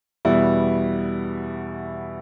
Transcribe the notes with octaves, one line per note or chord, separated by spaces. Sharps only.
E2 B2 G3 B3 E4